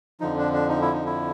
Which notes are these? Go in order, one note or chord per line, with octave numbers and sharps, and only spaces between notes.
F2 D3 F3 D#4
D4
D4
D#4
E4
D#4
E4